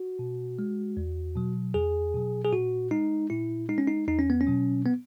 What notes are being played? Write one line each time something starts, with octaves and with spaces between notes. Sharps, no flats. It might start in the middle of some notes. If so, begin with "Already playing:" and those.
Already playing: F#4
B2
G#3
E2
B2 F#3
E2 G#4
B2 F#3
G#4
A#2 F#4
G#3 D#4
A#2 E4
G#3 D#4
C#4
D#4
E2 D#4
C#4
B3
C#4
B2 F#3
B3